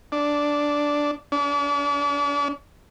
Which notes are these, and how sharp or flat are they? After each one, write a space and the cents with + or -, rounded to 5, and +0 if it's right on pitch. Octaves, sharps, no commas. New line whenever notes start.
D4 -5
D4 -40